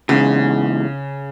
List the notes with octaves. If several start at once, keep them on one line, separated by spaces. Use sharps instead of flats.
E2 G#2 C#3